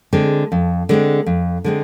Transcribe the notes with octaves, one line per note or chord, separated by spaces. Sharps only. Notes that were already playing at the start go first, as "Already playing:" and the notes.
D3 G#3 C4
F2
D3 G#3 C4
F2
D3 G#3 C4